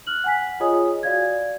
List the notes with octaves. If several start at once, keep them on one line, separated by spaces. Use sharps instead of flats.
F6 F#6 F#7
F#5 G#5 B6
F4 G#4 C#5 D#5 G#5 D#6
F#4 D5 F5 G#6